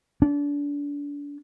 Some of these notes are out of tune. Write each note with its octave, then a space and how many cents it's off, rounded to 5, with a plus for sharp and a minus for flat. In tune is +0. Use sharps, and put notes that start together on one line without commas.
D4 -30